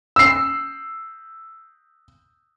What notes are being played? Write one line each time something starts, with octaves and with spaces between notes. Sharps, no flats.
E6 C7